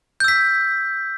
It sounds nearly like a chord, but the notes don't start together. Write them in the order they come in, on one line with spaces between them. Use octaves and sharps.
G6 E6 B6